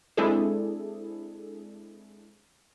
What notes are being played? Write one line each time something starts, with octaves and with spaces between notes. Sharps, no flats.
G#3 C4 D4 E4 G#4 A4